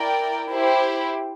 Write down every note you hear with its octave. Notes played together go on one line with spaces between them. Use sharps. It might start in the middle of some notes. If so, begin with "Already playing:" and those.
Already playing: E4 A#4 D5 G5
E4 G4 C5